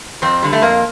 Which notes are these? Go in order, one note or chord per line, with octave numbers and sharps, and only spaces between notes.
F2 C4
D3 G3
A3
F2 A#3